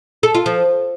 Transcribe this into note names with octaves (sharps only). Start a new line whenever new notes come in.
A4
F4
F3